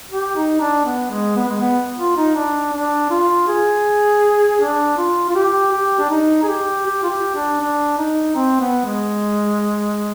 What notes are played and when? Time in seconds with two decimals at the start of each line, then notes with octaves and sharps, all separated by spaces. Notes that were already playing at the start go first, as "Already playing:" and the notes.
0.11 G4
0.36 D#4
0.60 D4
0.86 B3
1.10 G#3
1.36 B3
1.48 G#3
1.61 B3
1.98 F4
2.17 D#4
2.35 D4
2.73 D4
3.10 F4
3.48 G#4
4.61 D4
4.97 F4
5.29 F4
5.35 G4
5.72 G4
5.99 D4
6.10 D#4
6.43 G#4
6.48 G4
6.86 G4
7.03 F4
7.10 G4
7.35 D4
7.61 D4
7.98 D#4
8.35 C4
8.61 B3
8.85 G#3